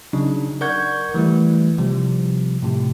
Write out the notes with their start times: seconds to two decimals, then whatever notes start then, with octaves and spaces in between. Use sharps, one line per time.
0.13 C#3 F#3 D4 D#4
0.61 A#4 D5 F#5 C#6 G6 G#6
1.14 E3 G3 A3 E4
1.78 C3 F3 G3
2.62 A2 C3